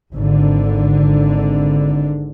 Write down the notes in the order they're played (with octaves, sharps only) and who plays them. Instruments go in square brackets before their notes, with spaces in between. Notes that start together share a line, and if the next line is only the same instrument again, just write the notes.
[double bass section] G#1 D3